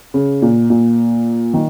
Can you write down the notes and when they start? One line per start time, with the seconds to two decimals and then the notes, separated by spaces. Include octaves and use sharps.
0.14 C#3
0.42 A#2
0.70 A#2
1.54 D#3